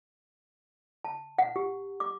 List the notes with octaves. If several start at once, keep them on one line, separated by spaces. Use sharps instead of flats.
A5
F#5
G4
D6